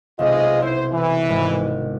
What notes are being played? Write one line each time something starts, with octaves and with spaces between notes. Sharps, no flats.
B1 C3 G#3 F4 D#5
E4 C5
E3
G#1